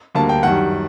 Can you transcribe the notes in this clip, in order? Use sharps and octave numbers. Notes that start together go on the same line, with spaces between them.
D2 D3 G3 A#3 A5
G5
F#2 D#3 G3 F#5